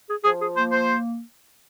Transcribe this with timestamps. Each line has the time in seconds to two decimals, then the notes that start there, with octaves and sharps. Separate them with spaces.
0.09 G#4
0.25 F3 G#4
0.41 G#4
0.57 A#3 C5
0.72 C5